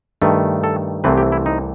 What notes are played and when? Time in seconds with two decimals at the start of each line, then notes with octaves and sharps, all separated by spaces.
0.22 G2 D#3 A3
0.64 A4
1.04 C2 C3 E3 A3 C4 B4
1.17 G4
1.32 E4
1.46 D#4